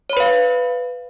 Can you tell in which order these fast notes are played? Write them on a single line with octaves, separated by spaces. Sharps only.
C#5 B5 B4 F5